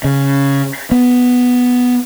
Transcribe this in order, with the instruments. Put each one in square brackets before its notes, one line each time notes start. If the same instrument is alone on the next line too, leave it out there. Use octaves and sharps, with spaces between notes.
[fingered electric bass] C#3
B3